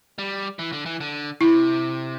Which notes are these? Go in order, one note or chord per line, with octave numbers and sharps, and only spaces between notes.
G3
E3
D3
E3
D3
C3 E4